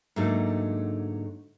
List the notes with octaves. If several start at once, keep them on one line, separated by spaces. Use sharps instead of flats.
G#2 D3 F#3 A3 A#3 D#4